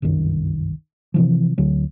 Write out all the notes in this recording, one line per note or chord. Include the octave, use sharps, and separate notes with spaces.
G1 C2 F#2 D#3
C3 E3 F3
D2 D3 F#3